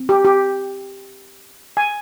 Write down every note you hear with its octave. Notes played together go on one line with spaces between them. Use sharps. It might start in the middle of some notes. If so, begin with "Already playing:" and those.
Already playing: C4
G4
G4
G#5